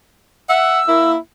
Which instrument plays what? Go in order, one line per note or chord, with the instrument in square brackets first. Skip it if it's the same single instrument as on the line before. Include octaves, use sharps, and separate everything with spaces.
[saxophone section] E5 F#5 [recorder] E6
[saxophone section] A#3 E4